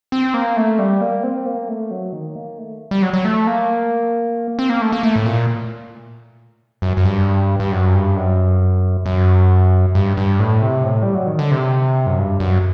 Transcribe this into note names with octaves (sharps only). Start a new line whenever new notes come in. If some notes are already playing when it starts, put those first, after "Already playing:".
C4
A#3
A3
G3
A#3
C4
A#3
A3
F#3
D#3
A#3
A3
G3
F#3
F#3
A3
A#3
C4
A#3
A3
A#3
A3
A2
A#2
F#2
F#2
G2
G2
F#2
G2
F#2
F#2
G2
G2
A2
C3
A2
G3
F#3
D#3
D3
C3
F#2
G2
F#2